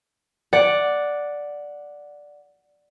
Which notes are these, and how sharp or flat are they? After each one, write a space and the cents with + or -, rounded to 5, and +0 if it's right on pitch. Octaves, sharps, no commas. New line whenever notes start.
D5 +0 F#5 -5